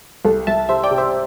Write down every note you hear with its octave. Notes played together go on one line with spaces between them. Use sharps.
C2 A4
C2 E5 A5
C3 C5 E5
D5 G5
C3
C5 E5